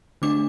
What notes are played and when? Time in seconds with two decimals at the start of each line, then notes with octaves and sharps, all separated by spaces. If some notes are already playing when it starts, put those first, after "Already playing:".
0.22 D3 A3 D4 D6